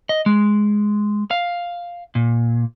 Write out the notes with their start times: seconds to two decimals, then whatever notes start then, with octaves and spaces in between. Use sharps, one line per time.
0.09 D#5
0.26 G#3
1.31 F5
2.15 A#2